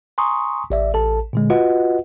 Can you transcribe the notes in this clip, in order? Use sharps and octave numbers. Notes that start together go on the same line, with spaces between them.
G#5 A#5 C6 C#6 D#6
A1 D5 E5
A1 A4 A5
A#2 D3 G#3
F4 F#4 B4 D#5 F#5